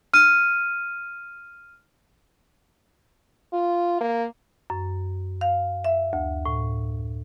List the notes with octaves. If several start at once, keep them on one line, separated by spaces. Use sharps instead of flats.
F6 D#7
F4
A#3
F#2
F5
E5
D2
A2